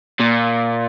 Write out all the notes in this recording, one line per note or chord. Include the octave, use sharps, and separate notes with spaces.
A#2